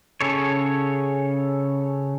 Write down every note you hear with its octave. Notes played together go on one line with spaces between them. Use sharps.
C#3 A4 C#5